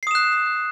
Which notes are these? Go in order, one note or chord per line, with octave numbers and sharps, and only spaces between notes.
D#6 F#6 C7 E7